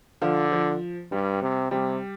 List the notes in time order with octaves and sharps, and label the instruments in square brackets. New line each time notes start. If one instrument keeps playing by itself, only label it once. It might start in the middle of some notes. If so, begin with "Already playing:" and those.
[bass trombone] D3 [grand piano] F3 F4
[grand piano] F3
[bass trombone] G2 [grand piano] G3
[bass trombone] C3
[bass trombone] C3 [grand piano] G3